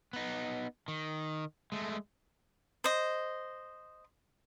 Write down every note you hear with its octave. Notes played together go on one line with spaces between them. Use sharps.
B3 D#4
D#3
G#3 A3
C5 D#5